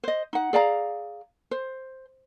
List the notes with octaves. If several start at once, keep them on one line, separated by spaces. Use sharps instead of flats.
C5 D#5
D#4 F#5
G#4 D5 F5 A#5
C5